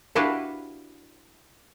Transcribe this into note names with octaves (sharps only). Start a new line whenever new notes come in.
D4 E4 F#4 G4 B4 F5